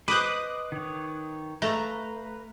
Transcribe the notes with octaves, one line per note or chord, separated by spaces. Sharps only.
B4 C5 D#5 C6 D6 D#6 F#6
D#3 C#5
A3 B4 F5 A#5